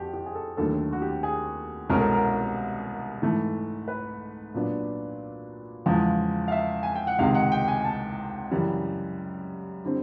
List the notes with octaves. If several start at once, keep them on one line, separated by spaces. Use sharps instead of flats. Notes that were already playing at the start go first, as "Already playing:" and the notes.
Already playing: F2 F#4 G4
G4
G#4
A4
D#2 D3 F#3 A3 A4
F#4
G4
G#4
C2 B2 G#3 C#4 A#4
A4
A#4
G#2 E3 A3
B4
A#2 F#3 B3 D4
E2 C#3 F3 G#3
F5
E5
G#5
G5
F#5
C#2 C3 D#3 G#3 F5
F#5
G5
G#5
G#5
A5
F#2 C#3 E3 G3
D3 G3 C4